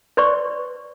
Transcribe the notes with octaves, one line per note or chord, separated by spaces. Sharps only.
B4 C5 D5 C6 C#6